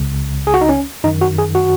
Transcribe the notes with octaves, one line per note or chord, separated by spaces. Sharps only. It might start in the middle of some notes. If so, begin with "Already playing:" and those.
Already playing: C#2 C#3
G#4
F#4
D#4
C#4
F#2 D#3 D#4
F#4
G#4
F#4